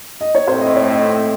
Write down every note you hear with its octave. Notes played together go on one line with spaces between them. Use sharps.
D#5
C#5
A2 A3 C4 C5
D#5
C#5
D#5